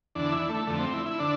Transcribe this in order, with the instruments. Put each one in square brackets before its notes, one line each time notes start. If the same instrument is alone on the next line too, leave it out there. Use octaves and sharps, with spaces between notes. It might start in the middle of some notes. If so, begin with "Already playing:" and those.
[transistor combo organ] E2 D3 D4
E4
A3
F2 D3 A3
C4
E4
E4
D3 D4